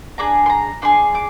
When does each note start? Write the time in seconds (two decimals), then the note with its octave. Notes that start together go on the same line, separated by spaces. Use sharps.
0.18 D4 G#4 A#5
0.46 C6
0.50 A#5
0.82 D4 G#4 C6
1.15 D6